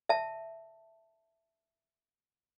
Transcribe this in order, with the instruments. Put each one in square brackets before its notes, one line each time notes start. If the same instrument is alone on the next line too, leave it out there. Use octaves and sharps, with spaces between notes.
[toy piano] E5 A5